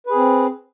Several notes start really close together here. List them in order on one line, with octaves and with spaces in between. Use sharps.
B4 G#4 C4